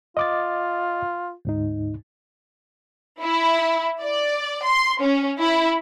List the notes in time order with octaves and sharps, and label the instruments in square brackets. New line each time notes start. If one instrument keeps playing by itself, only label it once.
[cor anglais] F4 [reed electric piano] D#5 D6 A6
[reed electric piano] D2 G#2 D#4
[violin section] E4
D5
C6
C#4
E4